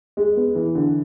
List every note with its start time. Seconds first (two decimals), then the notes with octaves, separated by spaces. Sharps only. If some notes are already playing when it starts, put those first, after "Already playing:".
0.17 G#3
0.36 B3
0.55 E3
0.75 D3